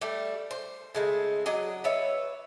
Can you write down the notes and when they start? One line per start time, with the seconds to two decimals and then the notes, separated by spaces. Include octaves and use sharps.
0.01 G3 A3
0.51 C5
0.95 C#3 G#3 A3
1.46 F#3 D4 D#5
1.84 B4 C#5 E5